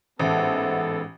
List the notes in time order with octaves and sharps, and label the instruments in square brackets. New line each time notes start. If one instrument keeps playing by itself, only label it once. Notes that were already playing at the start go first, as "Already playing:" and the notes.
[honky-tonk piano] A1 [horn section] G#2 B3 A4 [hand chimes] C5 E5 F#5